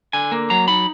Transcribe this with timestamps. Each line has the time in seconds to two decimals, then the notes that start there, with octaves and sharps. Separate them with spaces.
0.13 D3 G#5
0.32 A#3
0.50 F#3 A#5
0.68 D#4 B5